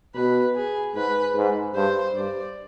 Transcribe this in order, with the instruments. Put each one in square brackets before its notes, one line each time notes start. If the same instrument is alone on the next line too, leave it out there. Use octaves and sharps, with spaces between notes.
[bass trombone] B2 [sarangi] B4
[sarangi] G#4
[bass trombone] G#2 [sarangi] B4
[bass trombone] G#2
[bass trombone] G2 [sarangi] C5
[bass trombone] G2 [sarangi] D5